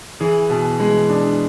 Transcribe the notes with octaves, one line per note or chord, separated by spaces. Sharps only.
E3 G#4
B2
G#3
D4